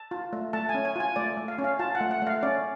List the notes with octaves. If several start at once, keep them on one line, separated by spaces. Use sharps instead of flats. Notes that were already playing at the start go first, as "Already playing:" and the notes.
Already playing: A5
F4
A3
A3 A5
G#5
C#4
G#5
F4 G#5
A3 D5
A3
F5
C#4
F5
F4 A5
F#5
A3
F#5
A3 F5
C#4 D5